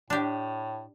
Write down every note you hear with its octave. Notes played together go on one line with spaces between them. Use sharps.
A2 D4 G4